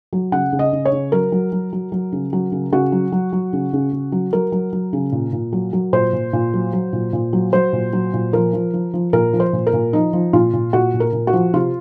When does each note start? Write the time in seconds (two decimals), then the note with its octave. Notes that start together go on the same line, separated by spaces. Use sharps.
0.13 F#3
0.32 C#3 F#5
0.52 C#3
0.59 D#5
0.73 C#3
0.85 C#5
0.92 C#3
1.12 F#3 A#4
1.32 F#3
1.52 F#3
1.73 F#3
1.92 F#3
2.12 C#3
2.33 F#3
2.52 C#3
2.72 C#3 F#4
2.92 F#3
3.12 F#3
3.32 F#3
3.53 C#3
3.73 C#3
3.93 C#3
4.12 F#3
4.33 F#3 A#4
4.52 F#3
4.73 F#3
4.93 C#3
5.12 A#2
5.33 A#2
5.53 F#3
5.73 F#3
5.93 A#2 C5
6.13 A#2
6.33 A#2
6.53 F#3
6.73 F#3
6.93 A#2
7.13 A#2
7.33 F#3
7.53 F#3 C5
7.73 A#2
7.93 F#3
8.13 A#2
8.33 F3 A#4
8.53 F3
8.74 F3
8.94 F3
9.13 A#2 A#4
9.33 F3
9.40 C5
9.53 A#2
9.67 A#4
9.73 A#2
9.93 F3 D#4
10.13 F3
10.33 A#2 F4
10.53 A#2
10.73 A#2 F#4
10.94 A#2
11.00 A#4
11.13 A#2
11.27 F#4
11.33 F3
11.53 C3 F4